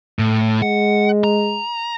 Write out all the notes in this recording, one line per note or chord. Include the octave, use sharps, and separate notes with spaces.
A2
G#3 F#5
A#5